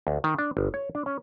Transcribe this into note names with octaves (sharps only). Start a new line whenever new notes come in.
D2
D#3
D4
G1
C#5
D4
C#4